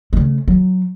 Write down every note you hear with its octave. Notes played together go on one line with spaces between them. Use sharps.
C#3 A3
F#3